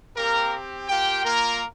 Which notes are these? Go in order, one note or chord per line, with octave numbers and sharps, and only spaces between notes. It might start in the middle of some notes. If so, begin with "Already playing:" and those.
A#3 C4 G4 A#4
A#3 F4 G4 G5
A#3 A#4